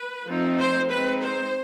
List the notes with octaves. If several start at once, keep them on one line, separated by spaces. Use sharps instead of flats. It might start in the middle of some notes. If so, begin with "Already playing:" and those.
Already playing: B4
F3 A3 C4 D#4
C5
G#3 C4 D#4 B4
C5